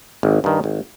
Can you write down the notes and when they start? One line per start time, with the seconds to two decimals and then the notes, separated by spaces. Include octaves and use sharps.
0.23 G#1
0.44 G2 D#3
0.64 G#1